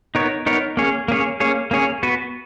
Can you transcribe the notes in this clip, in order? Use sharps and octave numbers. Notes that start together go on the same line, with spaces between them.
B3 D#4 A#4 C#5
B3 D#4 A#4 C#5
A#3 C#4 G#4 C#5
A#3 C#4 G#4 C#5
A#3 C#4 G#4 C#5
A#3 C#4 G#4 C#5
B3 F#4 B4